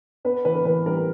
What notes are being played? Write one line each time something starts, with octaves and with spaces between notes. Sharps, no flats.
B3 B4
E3 B4
A#4
E3 B4
G3 A#4